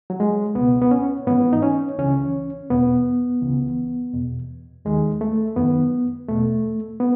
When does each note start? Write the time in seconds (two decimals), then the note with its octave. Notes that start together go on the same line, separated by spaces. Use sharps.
0.10 F#3
0.20 G#3
0.55 C#2 B2 B3
0.82 B3
0.91 C#4
1.27 G#2 E3 B3
1.53 D#4
1.63 C#4
1.98 C#2 C#3 E3 C#4
2.70 E2 B2 B3
3.41 C#2 C#3 E3
4.14 E2 B2
4.85 D#2 D#3 G#3
5.21 A3
5.56 F#2 D#3 B3
6.29 E2 B2 A3
7.00 B3